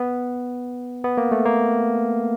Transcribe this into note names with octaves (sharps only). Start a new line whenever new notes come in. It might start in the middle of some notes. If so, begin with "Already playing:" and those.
Already playing: B3
B3
A#3
A3
A#3